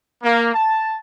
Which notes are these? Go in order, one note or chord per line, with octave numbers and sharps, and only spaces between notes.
A#3
A5